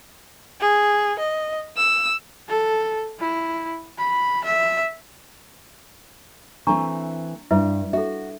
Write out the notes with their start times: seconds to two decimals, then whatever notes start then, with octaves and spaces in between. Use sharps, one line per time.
0.61 G#4
1.19 D#5
1.77 E6
2.48 A4
3.19 E4
3.98 B5
4.44 E5
6.67 E3 A3 C4 D4 A#5 C#6
7.51 G2 E4 B4 E5
7.93 F#4 A4 E5